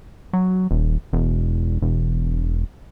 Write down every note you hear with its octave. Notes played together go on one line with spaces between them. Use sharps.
F#3
D#1
E1
E1